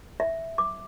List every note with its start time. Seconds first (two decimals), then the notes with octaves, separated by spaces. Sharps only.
0.20 E5
0.58 D6